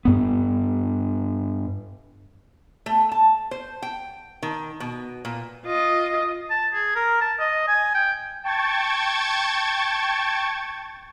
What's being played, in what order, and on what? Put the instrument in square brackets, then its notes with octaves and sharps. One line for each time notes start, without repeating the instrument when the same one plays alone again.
[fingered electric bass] G2 B3
[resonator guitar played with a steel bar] A3
A5
C5
G5
D#3
B2
A#2
[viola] F4 D#5
[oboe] A5
G#4
A#4
A5
D#5
G#5
G5
[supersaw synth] G5 A5 C#6 G#6 A6